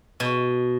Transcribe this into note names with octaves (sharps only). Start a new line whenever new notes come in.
B2